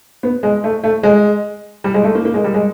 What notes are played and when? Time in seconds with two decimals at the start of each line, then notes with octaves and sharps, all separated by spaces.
0.23 B3
0.43 G#3
0.64 A3
0.84 A3
1.03 G#3
1.84 G3
1.94 G#3
2.04 A3
2.15 A#3
2.25 A#3
2.34 G#3
2.44 G3
2.54 G#3